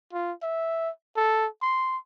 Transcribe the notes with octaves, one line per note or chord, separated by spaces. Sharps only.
F4
E5
A4
C6